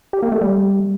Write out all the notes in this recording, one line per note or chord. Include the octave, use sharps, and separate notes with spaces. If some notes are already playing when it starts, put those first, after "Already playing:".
G4
A#3
A3
G3